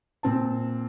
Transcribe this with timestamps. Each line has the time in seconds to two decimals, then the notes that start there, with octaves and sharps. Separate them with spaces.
0.23 A#2 C4 A5